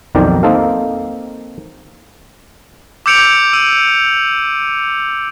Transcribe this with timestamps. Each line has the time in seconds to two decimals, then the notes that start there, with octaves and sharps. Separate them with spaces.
0.15 B1 F2 D#3 A#4 D5 G5
0.43 A#3 C4 D#4 A4 F5
3.06 D6 E6 G6 C#7 D7 F7
3.53 E6 D#7